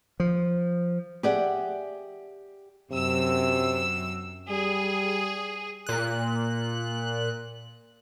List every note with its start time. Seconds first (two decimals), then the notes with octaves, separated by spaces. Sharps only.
0.20 F3
1.23 G4 G#4 D5 E5 F#5
2.92 F#2 C3 E6
4.50 G3 G#4
5.87 A#2 F#6